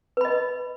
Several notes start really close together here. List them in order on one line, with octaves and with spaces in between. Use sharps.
B4 B5 D#5